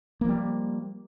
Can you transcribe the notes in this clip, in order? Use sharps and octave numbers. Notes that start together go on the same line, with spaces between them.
F3 G3 A#3